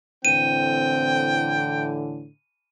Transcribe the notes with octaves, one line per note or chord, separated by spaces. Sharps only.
A2 D3 E3 C4 G5 D#7